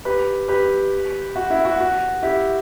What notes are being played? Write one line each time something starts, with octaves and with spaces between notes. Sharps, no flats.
G4 B4
G4 B4
F#4
E4
F#4
F#4
E4 G4